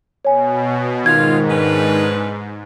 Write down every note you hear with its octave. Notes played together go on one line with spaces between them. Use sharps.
B2 C#5 G#5
G#2 D#3 F4 F5 G#6
C#4 D4 B4